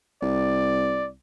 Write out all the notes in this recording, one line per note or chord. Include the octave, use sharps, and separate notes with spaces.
C2 D5